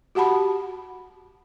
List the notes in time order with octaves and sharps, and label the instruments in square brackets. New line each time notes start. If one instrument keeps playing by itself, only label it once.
[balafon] F#4 G4 F#5 A5 B5